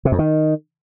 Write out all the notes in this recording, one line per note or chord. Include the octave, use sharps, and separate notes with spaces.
C3
F2
D#3